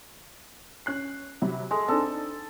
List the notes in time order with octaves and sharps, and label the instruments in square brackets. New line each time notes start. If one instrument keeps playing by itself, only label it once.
[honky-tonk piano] C#4 F#6 C7
C3 F#3 B5
[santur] G#3 [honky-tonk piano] A4
[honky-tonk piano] C4 D4 D#4 [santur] A4